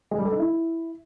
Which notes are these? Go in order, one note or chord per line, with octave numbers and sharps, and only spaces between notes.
G#3
G3
A4
D#4
E4